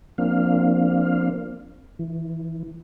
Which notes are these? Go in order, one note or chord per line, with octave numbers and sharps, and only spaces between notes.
F3 A#3 C4 D4 F5
E3